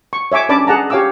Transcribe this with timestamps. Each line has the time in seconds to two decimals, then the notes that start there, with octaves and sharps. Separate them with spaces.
0.13 C#6
0.32 C#5 E5 G#5 D6
0.49 C#4 D4 D5 A5 B5 D6
0.67 G#4 F#5 A5 A#5
0.90 G4 C#5 F5 G#5 D6 E6